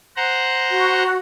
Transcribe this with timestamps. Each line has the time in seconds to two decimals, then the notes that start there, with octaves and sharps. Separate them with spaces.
0.17 C5 F#5 A#5
0.71 F#4